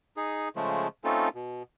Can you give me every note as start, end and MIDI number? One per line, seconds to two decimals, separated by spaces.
0.17 0.49 63
0.17 0.49 68
0.56 0.88 49
0.56 0.88 53
0.56 0.88 56
0.56 0.88 57
1.04 1.29 57
1.04 1.29 60
1.04 1.29 61
1.04 1.29 63
1.04 1.29 65
1.04 1.29 69
1.35 1.63 47